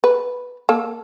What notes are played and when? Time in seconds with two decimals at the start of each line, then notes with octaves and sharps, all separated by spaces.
0.04 B4
0.69 A#3 A4